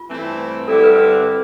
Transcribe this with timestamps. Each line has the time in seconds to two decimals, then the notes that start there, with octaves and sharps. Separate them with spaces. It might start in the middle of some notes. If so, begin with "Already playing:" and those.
Already playing: F4
0.09 G2 E3 A3 C4 E4
0.68 G2 D3 G3 C4 E4 A4
0.84 B4
0.98 B4
1.13 C5